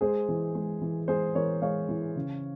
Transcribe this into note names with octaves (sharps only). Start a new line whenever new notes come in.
G#3 G#4 C5
E3
G#3
E3
G#3 G#4 C5
E3 A#4 C#5
G#3 C#5 F5
E3
C#3